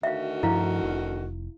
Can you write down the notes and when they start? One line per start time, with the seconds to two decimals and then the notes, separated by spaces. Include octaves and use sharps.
0.03 D2 D#3 F#4 E5 F5
0.43 G2 F3 E4 F5
0.83 F1